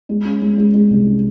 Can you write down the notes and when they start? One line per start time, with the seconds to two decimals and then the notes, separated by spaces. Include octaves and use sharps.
0.09 G#3
0.25 C#4
0.42 G#3
0.58 G#3
0.74 G#3
0.90 C2
1.06 C#4